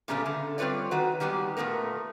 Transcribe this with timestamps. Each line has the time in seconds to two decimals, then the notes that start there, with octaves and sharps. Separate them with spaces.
0.08 A#2 C#3 G3 A3 B3 D4
0.26 D3
0.58 G3 C4 F4 B4 C#5 D5
0.91 D#3 F#4 B4
1.20 D#3 G3 G#3 B3
1.57 A#2 C#3 A3 B3 A#4